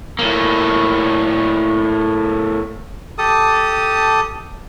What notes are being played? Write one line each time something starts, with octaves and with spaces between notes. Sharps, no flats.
A2 A#3
G4 A4 A5 D#6